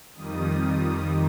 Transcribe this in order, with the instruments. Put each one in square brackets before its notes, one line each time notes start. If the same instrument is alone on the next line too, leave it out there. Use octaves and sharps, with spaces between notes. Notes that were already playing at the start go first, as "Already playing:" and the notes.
[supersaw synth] F2 D#3 G3 D#6